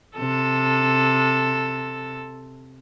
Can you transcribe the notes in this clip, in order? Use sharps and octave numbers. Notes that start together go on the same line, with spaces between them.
C3 A4